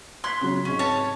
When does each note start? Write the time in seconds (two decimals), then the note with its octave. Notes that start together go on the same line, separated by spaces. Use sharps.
0.24 C6 F#6 G#6 B6
0.41 C#3 F#3
0.65 G#2 C3 C#4
0.79 C#5 A5